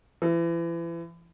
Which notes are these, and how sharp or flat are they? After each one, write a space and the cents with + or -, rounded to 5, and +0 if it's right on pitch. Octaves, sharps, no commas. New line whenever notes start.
E3 +35